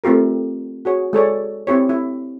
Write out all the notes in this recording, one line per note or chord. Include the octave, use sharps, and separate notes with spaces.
A3 C4 F4 G4 A#4
F#4 G#4 C#5
G#3 A4 C#5 D5
C4 E4 G4 C#5
E4